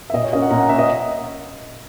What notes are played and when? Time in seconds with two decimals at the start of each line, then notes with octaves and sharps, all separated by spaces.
0.10 E5
0.14 A#2 D#5
0.23 C#5
0.33 A#3 C#4 D#5
0.42 F#5
0.51 A#2 A#5
0.60 F#5
0.69 A#3 C#4 E5
0.78 D#5